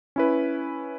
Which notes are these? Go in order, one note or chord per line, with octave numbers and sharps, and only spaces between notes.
C#4 E4 B4